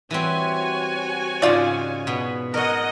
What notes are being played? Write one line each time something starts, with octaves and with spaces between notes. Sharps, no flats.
E3 G3 C4 F#4 C#5 G#5
G#2 C#3 F4 D5
B2 B3 B4
A#4 C#5 D#5 F#5